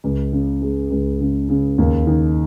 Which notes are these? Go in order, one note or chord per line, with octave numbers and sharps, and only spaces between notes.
C#2
C#3
G#3
C#2
C#3
C#3
D#2
D#3